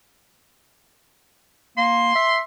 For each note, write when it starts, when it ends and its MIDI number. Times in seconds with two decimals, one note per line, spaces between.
1.77 2.15 58
1.77 2.39 84
2.15 2.40 76